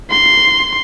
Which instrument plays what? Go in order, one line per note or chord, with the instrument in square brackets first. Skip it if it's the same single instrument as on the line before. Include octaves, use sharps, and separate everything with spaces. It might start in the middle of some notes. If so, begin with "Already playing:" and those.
[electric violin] C6